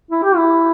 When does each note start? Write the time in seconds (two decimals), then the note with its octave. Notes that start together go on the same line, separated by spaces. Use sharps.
0.11 E4
0.23 G4
0.36 E4